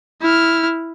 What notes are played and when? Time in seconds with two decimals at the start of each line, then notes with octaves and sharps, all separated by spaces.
0.22 E4 F6